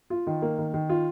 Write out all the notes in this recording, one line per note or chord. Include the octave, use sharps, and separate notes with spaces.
F4
D#3
A#3
D#3
D#3
F4